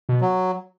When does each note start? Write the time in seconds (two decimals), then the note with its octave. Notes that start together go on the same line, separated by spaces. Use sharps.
0.09 B2
0.21 F#3